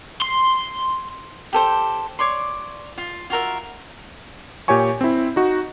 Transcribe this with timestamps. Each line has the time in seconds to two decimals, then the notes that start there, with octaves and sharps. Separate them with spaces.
0.22 C6
1.53 G4 A4 C5
2.19 C#5 D5 C6
2.98 F4
3.30 F4 F#4 A#4 E5
4.68 A#2 G4 C#5 G#5 C#6
5.01 C4 E4
5.36 D#4 F#4